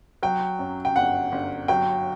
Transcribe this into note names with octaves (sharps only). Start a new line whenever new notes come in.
F#3 G5
F#2
G5
G1 F#5
G1
F#3 G5